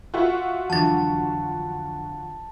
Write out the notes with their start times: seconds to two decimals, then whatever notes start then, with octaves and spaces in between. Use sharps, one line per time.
0.14 F4 F#4 E5
0.70 F2 D3 E3 F#3 D4 A5 A6